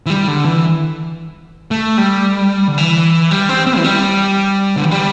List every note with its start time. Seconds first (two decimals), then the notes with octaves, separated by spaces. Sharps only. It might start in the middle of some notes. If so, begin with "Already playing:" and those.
0.06 E3
0.10 G3
0.28 D3
0.45 E3
1.71 A3
1.98 G3
2.68 D3
2.78 E3
3.31 G3
3.49 C4
3.67 C4
3.78 E3
3.84 G3
4.77 D3
4.84 E3
4.91 G3